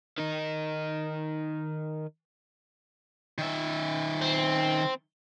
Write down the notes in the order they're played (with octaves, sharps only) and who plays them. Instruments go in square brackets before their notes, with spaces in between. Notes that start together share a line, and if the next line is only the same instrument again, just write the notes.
[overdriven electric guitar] D#3 D#4
[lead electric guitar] D#3 E5
[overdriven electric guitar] C4